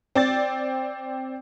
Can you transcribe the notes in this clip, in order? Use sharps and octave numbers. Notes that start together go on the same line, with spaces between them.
C4 D5 A6